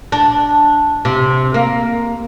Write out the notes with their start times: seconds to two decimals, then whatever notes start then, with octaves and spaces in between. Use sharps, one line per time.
0.12 D4
1.05 C3
1.54 A#3